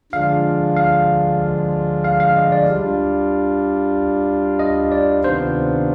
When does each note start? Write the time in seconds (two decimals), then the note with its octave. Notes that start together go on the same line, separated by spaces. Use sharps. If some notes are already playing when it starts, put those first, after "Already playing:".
0.12 D3 F3 G#3 D4 F4 F5
0.76 F5
2.04 F5
2.20 F5
2.36 D#5
2.52 D5
2.68 G3 D4 F4
4.59 D#5
4.92 D5
5.24 C3 D#3 B3 D4 F4 C5